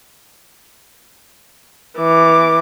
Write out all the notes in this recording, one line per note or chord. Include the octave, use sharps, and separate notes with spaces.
E3 D6